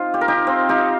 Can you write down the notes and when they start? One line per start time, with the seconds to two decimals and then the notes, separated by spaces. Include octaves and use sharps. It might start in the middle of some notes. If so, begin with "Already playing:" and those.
Already playing: C4 D#4 F4
0.14 G4
0.21 A#4
0.28 D#4 G4
0.47 C4 F4
0.69 D#4 G4